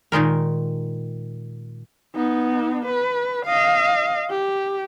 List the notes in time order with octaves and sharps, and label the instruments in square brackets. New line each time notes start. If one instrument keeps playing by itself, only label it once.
[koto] A#2 D#3 G#3 A#4
[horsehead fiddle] B3 D#4
B4
D#5 F5
G4